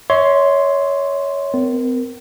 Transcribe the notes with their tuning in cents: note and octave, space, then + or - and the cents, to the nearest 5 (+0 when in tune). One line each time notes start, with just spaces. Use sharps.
C#5 +15 E5 -35 C6 +0
C4 -45 A#4 +0